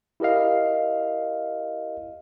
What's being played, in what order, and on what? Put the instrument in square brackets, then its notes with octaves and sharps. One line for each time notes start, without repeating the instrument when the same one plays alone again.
[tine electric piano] E4 G4 A#4 D#5 F5